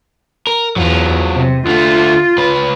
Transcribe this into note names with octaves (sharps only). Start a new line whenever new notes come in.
A#4
E2 F#3 F4
C3
D3 A3 F4
C#2 B4